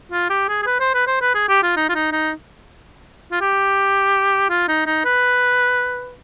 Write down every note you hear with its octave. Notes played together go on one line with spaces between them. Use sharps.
F4
G4
G#4
G#4
B4
C5
B4
C5
B4
G#4
G4
F4
D#4
F4
D#4
D#4
F4
G4
F4
D#4
D#4
B4